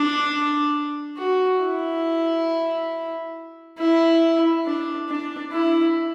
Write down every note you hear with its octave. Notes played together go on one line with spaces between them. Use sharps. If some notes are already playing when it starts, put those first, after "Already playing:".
Already playing: D4
F#4
E4
E4
D4
D4
E4